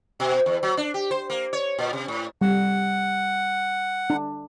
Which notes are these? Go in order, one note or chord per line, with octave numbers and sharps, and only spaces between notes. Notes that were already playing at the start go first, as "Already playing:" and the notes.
B2
E2
F#3
D4
G4
C5
A#3
C#5
A#2
C3
A2
G3 F#5
D4